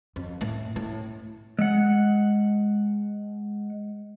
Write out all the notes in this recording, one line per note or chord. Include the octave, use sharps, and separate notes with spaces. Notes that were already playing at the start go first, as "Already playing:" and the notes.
F2
A2
A2
G#3 F#5